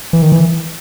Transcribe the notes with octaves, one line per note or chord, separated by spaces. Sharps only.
E3
D#3
E3